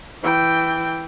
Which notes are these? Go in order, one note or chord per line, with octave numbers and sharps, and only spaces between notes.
E3 G5